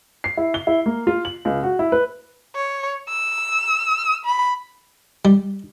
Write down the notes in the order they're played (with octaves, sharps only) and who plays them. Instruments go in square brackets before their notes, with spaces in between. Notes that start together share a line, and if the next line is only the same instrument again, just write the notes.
[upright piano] C7
E4
G7
E4
A#3
F4
F#7
C#2
F#4
E4
B4
[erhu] C#5
E6
B5
[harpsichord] G3